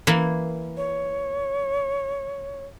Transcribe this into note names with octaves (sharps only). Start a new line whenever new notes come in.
E3 A#3 E4
C#5